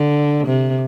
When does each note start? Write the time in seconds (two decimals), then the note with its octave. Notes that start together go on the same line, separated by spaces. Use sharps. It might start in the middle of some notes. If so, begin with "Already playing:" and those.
Already playing: D3
0.47 C3